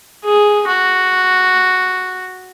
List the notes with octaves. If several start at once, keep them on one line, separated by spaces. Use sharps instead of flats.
G#4
F#4